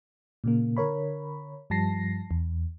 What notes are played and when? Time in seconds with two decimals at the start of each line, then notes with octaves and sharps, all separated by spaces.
0.44 A#2 C#3 A#3
0.77 D3 A#4 C#5 B5
1.70 G2 F3 G3 A5 A#6 C7
2.31 E2